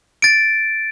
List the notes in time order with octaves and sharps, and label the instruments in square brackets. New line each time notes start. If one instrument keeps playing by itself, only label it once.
[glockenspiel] A6 D7